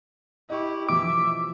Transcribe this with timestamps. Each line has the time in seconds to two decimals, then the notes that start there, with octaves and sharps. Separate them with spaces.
0.50 E4 G4 D#5 C#6
0.89 B2 E3 F3 E5 D6